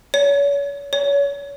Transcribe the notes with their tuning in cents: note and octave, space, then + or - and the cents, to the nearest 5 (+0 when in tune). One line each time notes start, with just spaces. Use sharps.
C#5 +35
C#5 +30